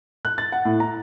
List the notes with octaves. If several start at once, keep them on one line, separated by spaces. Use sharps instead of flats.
F#6
A6
F#5
A2
A#5